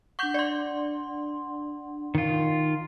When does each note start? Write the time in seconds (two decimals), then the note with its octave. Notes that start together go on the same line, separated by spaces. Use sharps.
0.19 D4 F#5 C#6 D6 G6
0.34 D5 C6
2.15 D#3 F4